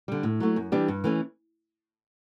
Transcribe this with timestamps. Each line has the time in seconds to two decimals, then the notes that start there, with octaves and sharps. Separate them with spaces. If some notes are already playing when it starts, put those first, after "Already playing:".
0.08 D3 G3
0.23 A2
0.40 F#3 A3
0.56 F#2
0.72 E3 G3 D4 G4
0.88 G2
1.04 E3 A3 C#4